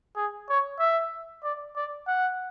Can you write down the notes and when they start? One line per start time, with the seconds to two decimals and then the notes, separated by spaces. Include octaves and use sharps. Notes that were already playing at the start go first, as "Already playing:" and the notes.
0.16 G#4
0.49 C#5
0.80 E5
1.43 D5
1.76 D5
2.07 F#5